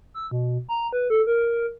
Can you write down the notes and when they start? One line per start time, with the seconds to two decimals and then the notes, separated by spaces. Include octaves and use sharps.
0.14 E6
0.31 B2
0.69 A#5
0.93 B4
1.10 A4
1.27 A#4